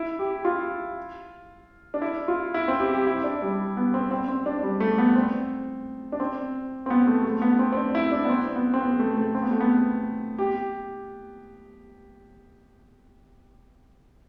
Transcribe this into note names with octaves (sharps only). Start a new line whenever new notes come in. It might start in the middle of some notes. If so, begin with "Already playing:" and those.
Already playing: E4
G4
F4
D4
E4
F4
E4
C4
G4
G4
E4
D4
G3
B3
C4
C4
C4
D4
G3
A3
B3
C4
D4
C4
C4
B3
A3
A3
B3
C4
C4
D4
E4
D4
B3
C4
B3
C4
B3
A3
A3
C4
B3
A3
B3
G4